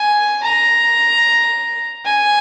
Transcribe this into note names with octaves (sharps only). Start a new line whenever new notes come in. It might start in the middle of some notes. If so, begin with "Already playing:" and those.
Already playing: G#5
A#5
G#5